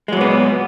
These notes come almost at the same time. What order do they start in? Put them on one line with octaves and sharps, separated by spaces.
G#3 F#3 A#2 B3